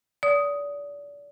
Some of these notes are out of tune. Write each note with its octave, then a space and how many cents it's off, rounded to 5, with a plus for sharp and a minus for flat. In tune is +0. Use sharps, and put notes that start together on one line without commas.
D5 -30 D#6 +5